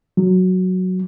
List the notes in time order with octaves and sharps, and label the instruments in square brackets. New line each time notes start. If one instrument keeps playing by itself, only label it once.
[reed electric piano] F#3